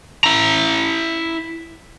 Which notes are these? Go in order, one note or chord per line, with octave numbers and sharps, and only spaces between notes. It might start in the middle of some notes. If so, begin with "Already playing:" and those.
E4 A#5